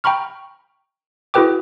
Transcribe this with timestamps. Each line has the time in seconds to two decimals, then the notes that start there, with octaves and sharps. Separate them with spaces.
0.04 G5 A#5 B5 C#6 F6
1.34 E4 F#4 G#4 B4 G5 D6